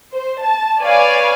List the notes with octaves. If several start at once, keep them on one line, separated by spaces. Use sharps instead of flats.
C5
A5
B4 C#5 D5 F5 G#5